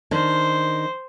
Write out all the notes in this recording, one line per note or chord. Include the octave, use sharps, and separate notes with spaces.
D#3 D4 C5